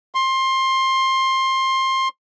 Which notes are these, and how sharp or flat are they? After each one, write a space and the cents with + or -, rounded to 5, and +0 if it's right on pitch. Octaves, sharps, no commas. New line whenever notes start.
C6 +20